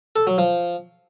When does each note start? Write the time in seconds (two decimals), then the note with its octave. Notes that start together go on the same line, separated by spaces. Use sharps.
0.16 A4
0.27 F#3
0.38 F3